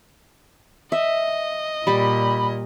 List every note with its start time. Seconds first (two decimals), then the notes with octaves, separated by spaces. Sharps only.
0.92 D#5 E5
1.87 A#2 G3 G4 B5